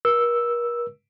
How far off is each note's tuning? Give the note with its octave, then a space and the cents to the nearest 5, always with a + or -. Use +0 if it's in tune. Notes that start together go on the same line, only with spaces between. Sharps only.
A#4 +40 E6 +0